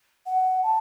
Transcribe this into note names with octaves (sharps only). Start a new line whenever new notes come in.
F#5
A5